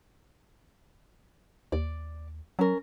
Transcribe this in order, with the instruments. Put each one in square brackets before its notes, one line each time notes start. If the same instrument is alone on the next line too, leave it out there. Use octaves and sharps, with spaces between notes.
[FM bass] D#2 [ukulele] D5
[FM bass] F#3 [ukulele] C#4 A#4